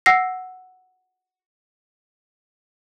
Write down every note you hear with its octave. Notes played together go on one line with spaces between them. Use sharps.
F#5 E6 A#6 C7